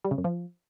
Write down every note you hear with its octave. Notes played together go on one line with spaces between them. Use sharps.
G3
C#3
F#2
F3